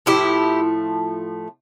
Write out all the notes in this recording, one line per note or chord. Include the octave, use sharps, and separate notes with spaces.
A2 F3 A3 E4 G4